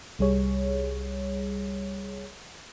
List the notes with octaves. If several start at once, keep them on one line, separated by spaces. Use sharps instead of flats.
C2 G3 G#4 C#5